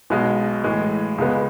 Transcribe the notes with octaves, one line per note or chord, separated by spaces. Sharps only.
B1 B2 G#3
A2 E3 G#3
C#2 C#3 G#3 B3